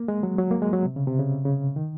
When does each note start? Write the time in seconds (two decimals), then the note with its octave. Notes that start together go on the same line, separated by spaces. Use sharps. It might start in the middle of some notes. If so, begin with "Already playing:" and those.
Already playing: A#3
0.08 G#3
0.23 F#3
0.38 F#3
0.51 A#3
0.62 G#3
0.73 F#3
0.85 C3
0.96 C#3
1.07 C3
1.19 C#3
1.45 C#3
1.76 D#3